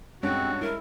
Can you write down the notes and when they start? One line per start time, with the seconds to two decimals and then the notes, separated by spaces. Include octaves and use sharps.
0.23 G2 G#3 C4 C#4 F#4
0.61 E4 A#4